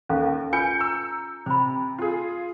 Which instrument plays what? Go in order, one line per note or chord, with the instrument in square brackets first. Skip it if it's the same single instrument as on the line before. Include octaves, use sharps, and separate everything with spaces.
[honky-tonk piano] D#2 [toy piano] C#4 A4 F5
[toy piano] F4 B4 G#5 [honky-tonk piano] G6 C#7
[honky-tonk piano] A#5 E6
[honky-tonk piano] C3 [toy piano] C5 B5
[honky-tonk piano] F4 G#4